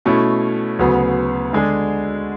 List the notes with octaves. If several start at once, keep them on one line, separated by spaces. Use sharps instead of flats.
B2 A3 C#4 E4
D2 C#3 F#3 B3
D3 G#3 D4 G#4